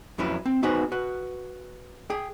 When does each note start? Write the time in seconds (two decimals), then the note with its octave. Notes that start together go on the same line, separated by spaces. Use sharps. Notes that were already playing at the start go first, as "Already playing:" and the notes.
0.18 F2 F#3 C#4 E4 B4
0.46 C4
0.63 B3 D#4 F#4 G#4 B4 C5
0.92 F#4 B4
2.10 G#4 G5